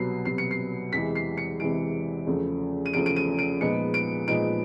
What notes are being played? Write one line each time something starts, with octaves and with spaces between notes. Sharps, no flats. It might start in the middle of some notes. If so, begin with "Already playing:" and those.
Already playing: C2 B2 F#3 B3 C7
C2 B2 F#3 B3 C7
C#7
C7
E2 C3 E3 G#3 B6
C7
C#7
E2 C3 E3 G#3 D7
E2 C#3 F3 A3
D#7
E2 C#3 F3 A3 D7
D7
D#7
D7
A#2 F3 G#3 B3 D#4 C#7
D7
A#2 F3 G#3 B3 D#4 D7